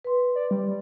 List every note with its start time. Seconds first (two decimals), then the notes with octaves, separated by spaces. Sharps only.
0.04 B4 C6
0.35 D5
0.51 G3